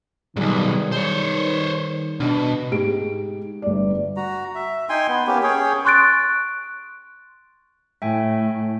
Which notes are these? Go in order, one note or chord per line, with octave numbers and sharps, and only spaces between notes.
B1 G#2 D#3 G3 G#4
C5 C#5
B2 D4
G#2 G4 D7
G1 D5
F#4 A#5
E5
D#4 G5 G#5 C6
B3
A#3 B3 C#4 G4
C#4 G#4 C#5 G5
C6 C#6 F#6 A6 D7
A2 E5 G5 G#5